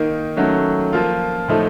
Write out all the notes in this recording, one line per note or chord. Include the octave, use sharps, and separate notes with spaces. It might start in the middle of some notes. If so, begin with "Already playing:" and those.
Already playing: D#3 A#3 D#4
D#3 F#3 A3 C#4
F3 A#3 F4
A2 F3 A3 D#4